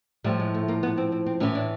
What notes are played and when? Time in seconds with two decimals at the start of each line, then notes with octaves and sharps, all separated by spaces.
0.24 A2 F3 G3
0.40 G#3
0.54 A3
0.68 A#3
0.83 B3
0.97 C4
1.12 C4
1.26 C4
1.40 A2 E3 C#4
1.55 D4